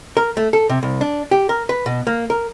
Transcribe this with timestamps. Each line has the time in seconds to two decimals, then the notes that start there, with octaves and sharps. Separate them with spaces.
0.17 A#4
0.37 A3
0.53 A4
0.69 C3
0.83 C2
1.01 D4
1.31 G4
1.49 A#4
1.69 B4
1.86 B2
2.07 A#3
2.30 A#4